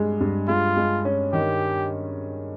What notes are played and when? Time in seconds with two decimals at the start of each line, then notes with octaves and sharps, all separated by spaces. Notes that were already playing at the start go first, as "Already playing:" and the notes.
Already playing: G2 G#3
0.20 G2
0.48 G#3 F4
0.77 G#3
1.05 C#4
1.33 D#3 G4